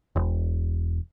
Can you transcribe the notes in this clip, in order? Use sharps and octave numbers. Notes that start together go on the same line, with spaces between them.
E1